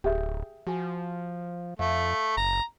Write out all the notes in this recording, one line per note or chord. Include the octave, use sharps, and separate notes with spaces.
D1 G4 G#4 E5
F3 F#4 G#5
F2 A3 E5 F5
F#1 A#5